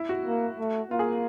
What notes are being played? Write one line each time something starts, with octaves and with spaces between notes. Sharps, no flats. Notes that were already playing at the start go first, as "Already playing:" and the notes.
Already playing: E4
F#4
A#3
A3
A#3 F4
G#4